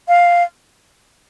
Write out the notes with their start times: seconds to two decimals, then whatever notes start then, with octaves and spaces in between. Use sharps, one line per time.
0.08 F5